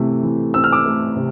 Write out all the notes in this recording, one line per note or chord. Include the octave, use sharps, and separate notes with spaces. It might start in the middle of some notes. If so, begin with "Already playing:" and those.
Already playing: C3 E3 A3 C4
E3
C4 E6
F6
D6 E6
A3
C3